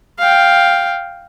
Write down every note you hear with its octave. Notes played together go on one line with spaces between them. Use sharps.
F5 G5